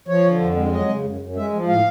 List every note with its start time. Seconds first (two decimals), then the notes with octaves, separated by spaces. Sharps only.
0.08 F3 C#5
0.25 D3
0.41 F2
0.57 G#3
0.72 F#3 D#5
0.88 C#3
1.04 F#2
1.21 F#2
1.36 G#3 E5
1.53 F3
1.68 A2 F5